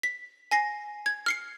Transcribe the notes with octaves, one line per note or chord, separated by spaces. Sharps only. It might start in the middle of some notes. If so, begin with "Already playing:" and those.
B6
G#5 A#6 C7
G#6
F6 C7 C#7